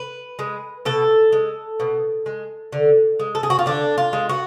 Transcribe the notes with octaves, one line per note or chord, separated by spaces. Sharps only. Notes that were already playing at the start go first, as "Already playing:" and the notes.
Already playing: B4
G#3
B2 A4
G#3
B2
G#3
D3
G#3
A4
G#4
F#4
F4
D3 D4
F4
G#3
F#4